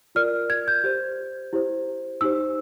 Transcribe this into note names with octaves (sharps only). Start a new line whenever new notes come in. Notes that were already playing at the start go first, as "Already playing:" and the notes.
F4 A#4 D5 F6
G#6
G6
G4 C5
E4 G4 C5
D#4 G4 C5 E6